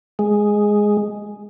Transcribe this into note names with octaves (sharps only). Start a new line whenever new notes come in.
G#3